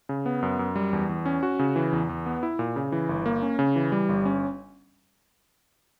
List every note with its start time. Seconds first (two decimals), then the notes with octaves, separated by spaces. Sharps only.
0.09 C#3
0.26 B3
0.42 F#2
0.59 F#2
0.76 G3
0.93 E2
1.09 E2
1.26 C#4
1.43 F#4
1.59 C#3
1.76 E3
1.92 E2
2.09 E2
2.26 B3
2.43 E4
2.59 A#2
2.76 C#3
2.92 E3
3.09 G1
3.26 A#3
3.42 C#4
3.59 C#3
3.76 E3
3.92 G3
4.09 G1
4.25 C#4